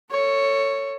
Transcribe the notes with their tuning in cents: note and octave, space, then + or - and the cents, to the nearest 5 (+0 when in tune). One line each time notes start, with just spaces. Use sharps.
A4 +30 C#5 +0